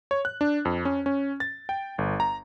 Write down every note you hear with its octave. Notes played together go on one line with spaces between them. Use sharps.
C#5
F#6
D4
F2
C#4
C#4
A6
G5
G1
A#5